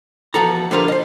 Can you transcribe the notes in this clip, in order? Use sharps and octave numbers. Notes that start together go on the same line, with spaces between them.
E2 F3 F#4 A4 A#5
D3 F3 G3 F4 A#4 B4
C5 D#5